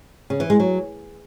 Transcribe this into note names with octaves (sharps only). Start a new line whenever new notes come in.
C#3
E3
G#3
F#3